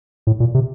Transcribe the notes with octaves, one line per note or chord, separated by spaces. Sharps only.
A2
A#2
C3